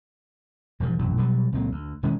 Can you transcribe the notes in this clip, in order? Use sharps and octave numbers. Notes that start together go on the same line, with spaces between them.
E1 G2 F3
E1 A#1 F#2 F#3
B2 F#3 G3
C#2 A#2 F#3 C4
D2
E1 D#3 G#3 C#4